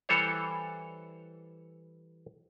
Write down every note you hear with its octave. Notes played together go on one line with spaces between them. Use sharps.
E3 G3 A4 C5 C#5